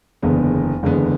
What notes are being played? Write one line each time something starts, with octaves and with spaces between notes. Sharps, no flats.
F#1 E2 D3 G#3 B3
F#1 E2 D3 G#3 B3